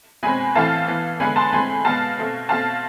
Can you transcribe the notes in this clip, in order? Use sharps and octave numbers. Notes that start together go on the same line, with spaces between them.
B2 G#3 C4 G#5 B5
A2 E3 A3 C4 F5 A5
E3 B3
D3 G#3 B3 G#5 B5
A5 C6
A2 G#3 C4 G#5 B5
B2 G#3 B3 F5 A5
B2 A3 C4
B2 A3 C4 F5 A5